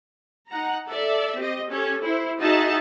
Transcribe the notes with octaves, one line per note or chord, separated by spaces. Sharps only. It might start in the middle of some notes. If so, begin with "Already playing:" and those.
D#4 F#5 A#5
A4 D5 E5
C4 G4 D#5
C#4 G4 A4 C#5
E4 C5
D#4 F#4 G#4 D#5 E5 A5